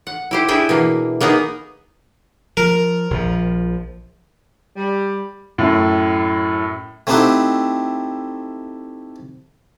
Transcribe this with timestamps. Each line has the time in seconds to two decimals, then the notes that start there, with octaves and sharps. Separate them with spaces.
0.07 F#5
0.31 E4 G4 C5
0.48 D4 E4 G#4 G5
0.69 B2 E3 A#3
1.20 A#3 B3 D#4 G#4 A#5
2.57 F3 A#4
3.11 A#1 F3
4.76 G3
5.58 F#2 A2
7.07 A3 C4 D#4 E4 G4 F#5